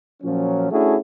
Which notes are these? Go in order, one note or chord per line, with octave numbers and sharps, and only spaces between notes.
A#2 F3 F#3 C#4
A3 C#4 D4 E4 F#4 G#4